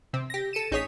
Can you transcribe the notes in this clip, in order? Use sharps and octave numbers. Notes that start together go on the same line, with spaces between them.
C3 C4
G4 A#6
A4 C#7 D#7 E7
A1 D#4 G#4 C#5 D#6 B6